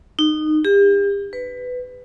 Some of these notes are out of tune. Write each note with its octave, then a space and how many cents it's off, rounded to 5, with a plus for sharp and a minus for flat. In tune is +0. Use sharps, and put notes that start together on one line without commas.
D#4 -20
G4 +40
B4 +15